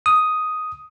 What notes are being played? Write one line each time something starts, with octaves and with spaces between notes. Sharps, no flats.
D#6